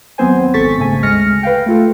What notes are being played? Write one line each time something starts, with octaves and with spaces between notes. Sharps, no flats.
D#2 F#3 B3 C4 C5 G#5
G#1 C#2 A4 C#6 A6 B6
G1 G#2 C#3 A3 G#5
D2 G#3 F6 A#6 C#7
B4 F5 G5
A3 F4 A4